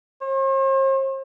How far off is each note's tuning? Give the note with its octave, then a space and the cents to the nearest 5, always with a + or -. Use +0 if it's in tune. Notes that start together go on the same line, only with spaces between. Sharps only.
C5 +45